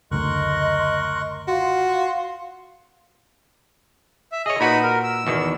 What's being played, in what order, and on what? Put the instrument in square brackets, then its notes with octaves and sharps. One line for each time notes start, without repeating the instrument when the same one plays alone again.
[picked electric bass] F#1 D2 A3 [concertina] A#4 C#6 F#6 [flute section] D#5 C6
[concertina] F4 [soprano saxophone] F#4 [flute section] F5 C6
[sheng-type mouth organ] E5
[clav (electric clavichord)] G#4 C#5 [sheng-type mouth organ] D#5
[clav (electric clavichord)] A#2 F#4 B4 [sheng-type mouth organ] D#4 B5
[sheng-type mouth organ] A#4
E6
[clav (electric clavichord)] E2 B2 D#3